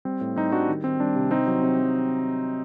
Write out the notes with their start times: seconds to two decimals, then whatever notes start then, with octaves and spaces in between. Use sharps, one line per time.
0.05 G3 C4
0.21 A2
0.36 G3 C4 D#4
0.52 G3 D4 F#4
0.69 D#3
0.84 D#3 C4
1.00 G3 D4
1.16 C3
1.31 C3 C4 D#4
1.47 F#3
1.62 C3
1.79 F#3